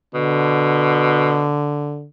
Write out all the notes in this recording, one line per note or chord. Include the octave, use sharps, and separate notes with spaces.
B2 D3